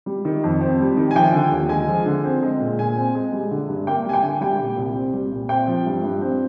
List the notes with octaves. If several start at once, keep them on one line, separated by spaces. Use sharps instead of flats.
G3
D#3
F2
C4
G3
D#3
G#5
F3 G5
D3
D#2
G#3 G#5
F3
D3
C4
G#3
A#2
A#2 G#5
C4
G#3
G3
D3
G2
A#3 G5
G3 G#5
G5
D3
G3 G5
A#2
C2
C4
G3
A#2
C4 G5
F3
G2
G2
C4